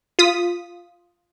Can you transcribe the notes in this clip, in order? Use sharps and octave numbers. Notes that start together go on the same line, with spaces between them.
F4 D#6 B6